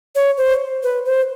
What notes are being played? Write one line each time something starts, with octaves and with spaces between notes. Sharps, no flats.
C#5
C5
B4
C5